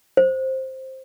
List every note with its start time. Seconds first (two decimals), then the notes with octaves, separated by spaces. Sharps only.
0.17 C5